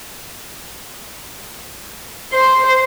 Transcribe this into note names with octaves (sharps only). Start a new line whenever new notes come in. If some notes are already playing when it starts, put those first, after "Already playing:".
C5